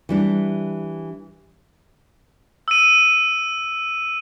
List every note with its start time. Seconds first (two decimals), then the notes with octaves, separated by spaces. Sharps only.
0.09 E3 G3 D4
2.68 E6 D#7